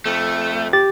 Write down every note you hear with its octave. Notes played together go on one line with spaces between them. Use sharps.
F2 A3
G4 A6